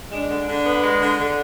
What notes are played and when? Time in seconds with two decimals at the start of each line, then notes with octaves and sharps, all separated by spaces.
0.12 G#3 D4
0.30 D3
0.47 D3
0.65 B3
0.82 G#3
1.01 D3
1.19 D3